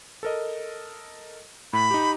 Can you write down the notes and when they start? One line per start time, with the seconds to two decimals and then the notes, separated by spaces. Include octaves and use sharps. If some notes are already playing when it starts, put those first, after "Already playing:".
0.23 A4 A#4 D#5
1.73 A2 B5
1.91 D#4 G4